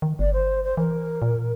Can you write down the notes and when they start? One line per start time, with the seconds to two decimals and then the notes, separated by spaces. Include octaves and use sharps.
0.02 D#3
0.19 G1 D5
0.33 C5
0.63 C5
0.77 E3 A#4
1.22 A#2